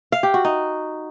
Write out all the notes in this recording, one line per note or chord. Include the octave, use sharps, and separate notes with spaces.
F5
G4
F#4
D#4